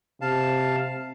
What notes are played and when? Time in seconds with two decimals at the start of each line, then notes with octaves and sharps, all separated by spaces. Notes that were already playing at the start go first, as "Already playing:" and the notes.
0.21 C3 F5 A5